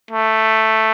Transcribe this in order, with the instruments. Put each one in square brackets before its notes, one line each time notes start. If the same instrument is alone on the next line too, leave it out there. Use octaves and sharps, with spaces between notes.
[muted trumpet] A3